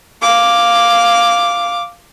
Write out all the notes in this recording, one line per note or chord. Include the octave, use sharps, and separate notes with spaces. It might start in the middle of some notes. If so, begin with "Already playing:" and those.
F5 D6